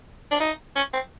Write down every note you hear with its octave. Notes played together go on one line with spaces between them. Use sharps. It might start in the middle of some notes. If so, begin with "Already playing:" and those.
D4
D#4
C#4
C4